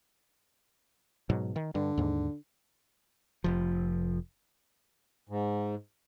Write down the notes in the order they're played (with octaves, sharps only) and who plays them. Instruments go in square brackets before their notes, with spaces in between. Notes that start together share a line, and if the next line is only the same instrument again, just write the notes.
[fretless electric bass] G#2 B2 F#3
D#3
[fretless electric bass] G2 [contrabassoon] D3
[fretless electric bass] D#2 G#2
[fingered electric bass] F1 F3
[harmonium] G#2